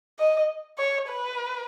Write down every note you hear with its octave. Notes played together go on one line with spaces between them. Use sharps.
D#5
C#5
B4